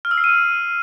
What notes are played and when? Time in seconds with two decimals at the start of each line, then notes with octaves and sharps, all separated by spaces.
0.05 F6
0.11 E6
0.18 C7
0.24 D#7